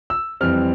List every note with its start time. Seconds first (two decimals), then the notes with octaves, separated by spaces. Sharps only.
0.10 E6
0.41 F2 E3 G3 C4 F6